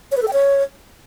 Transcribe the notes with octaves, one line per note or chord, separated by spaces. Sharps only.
C#5
B4
A4
G5
C#5